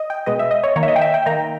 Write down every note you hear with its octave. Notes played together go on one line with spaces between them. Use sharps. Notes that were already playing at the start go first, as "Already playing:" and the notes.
Already playing: D#5
G5
B2 G#3 B3 D#5
E5
D#5
C#5
D#3 A#3 D#4 C#5
E5
D#5
G5
E5
G5
D#3 A#3 D#4 A#5